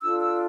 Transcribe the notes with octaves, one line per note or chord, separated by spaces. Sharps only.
D4 F4 A4 E6
E6